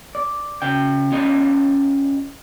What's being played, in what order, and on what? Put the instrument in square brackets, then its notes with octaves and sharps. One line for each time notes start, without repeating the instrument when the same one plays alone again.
[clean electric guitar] D5
C#3 G5
C#4 F4 G4 D5 D#5